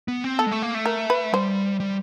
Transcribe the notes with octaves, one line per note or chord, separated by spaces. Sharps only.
B3
C4
B3 A4
G#3
A3
A#3
A3
A#4
B4
G3 C5
G3